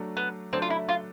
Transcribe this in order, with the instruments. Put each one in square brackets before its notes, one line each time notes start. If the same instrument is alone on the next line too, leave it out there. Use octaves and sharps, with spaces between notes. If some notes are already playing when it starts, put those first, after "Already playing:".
Already playing: [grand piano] F#3 A3 D4
[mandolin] B3
[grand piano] F#3 A3 D4 [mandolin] C4
[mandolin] F4
E4
F4